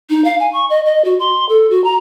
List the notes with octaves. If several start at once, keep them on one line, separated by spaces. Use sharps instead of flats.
D#4
F5
G#5
C#6
D#5
D#5
F#4
C6
A4
F#4
A#5